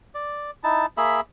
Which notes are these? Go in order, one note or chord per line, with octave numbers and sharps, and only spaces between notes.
D5
D#4 E4 A5
A#3 G#4 E5 B5